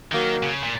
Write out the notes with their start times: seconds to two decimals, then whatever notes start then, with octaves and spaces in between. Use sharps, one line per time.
0.12 D#3 F#3 A#3
0.43 C#3
0.63 A#2